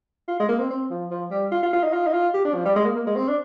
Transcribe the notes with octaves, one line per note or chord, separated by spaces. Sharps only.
F4
G#3
A#3
C4
C4
F3
F3
G3
F4
F4
F4
D#4
F4
D#4
F4
G4
D4
F3
G3
G#3
A#3
A#3
G#3
C4
D4